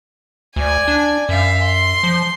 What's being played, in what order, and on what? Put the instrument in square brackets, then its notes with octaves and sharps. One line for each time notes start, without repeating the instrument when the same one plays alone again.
[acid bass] D2 [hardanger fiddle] D5 G#5
[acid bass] D4
[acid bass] F#2 [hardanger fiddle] E5 F5
[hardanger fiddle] C6
[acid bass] F3